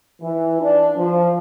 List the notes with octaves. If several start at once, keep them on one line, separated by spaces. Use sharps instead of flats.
E3
D4
F3